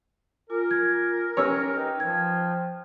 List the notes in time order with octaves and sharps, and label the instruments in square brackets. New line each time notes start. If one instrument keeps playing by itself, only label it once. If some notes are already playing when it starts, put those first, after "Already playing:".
[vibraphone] F4 G#5 D6 [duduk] A#4
[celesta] G#6
[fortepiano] C#4 G4 C#5 [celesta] B4 C#6 E6 [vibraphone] G#5 D6
[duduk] D#4 [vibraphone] G5
[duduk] F3 [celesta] G#6